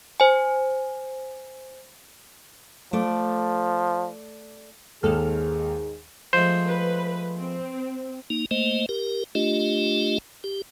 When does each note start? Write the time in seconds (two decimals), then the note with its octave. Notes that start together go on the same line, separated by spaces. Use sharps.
0.20 C5 G#5
2.93 F3 A3 D5
5.03 D#2 G#2 D#3 G#3 G#4 A4 F6
6.33 F3 G#3 A3 C5
6.67 B4
7.38 C4
8.30 A#3 D#4
8.51 A3 A#3 C5 D#5
8.89 G4 A#4
9.35 A3 D4 F4 G4 D#5
10.44 G4